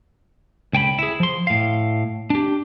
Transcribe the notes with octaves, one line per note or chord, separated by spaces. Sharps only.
C#2 G5 G#5 B5
E4 G#4
F3 C6
A2 F5
D4 G4